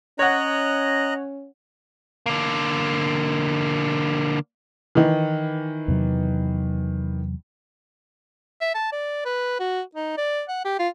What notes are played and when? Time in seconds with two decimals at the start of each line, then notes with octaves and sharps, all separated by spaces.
0.19 C#4 C#5 D#5 F#5 A#5 F#6
2.26 D3 A#3
4.95 D#3 E3
5.88 E2 C3 F#3
8.61 E5
8.75 A5
8.92 D5
9.25 B4
9.59 F#4
9.95 D#4
10.17 D5
10.49 F#5
10.65 G4
10.79 F4